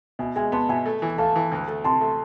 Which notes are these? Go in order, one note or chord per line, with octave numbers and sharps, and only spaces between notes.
B2 E5 G#5
G#3 E5 G#5
B3 A5 C6
B2 E5 G#5
A3
E3
A3 F5 A5
E3
D2
A3
C3 A5 C6
A3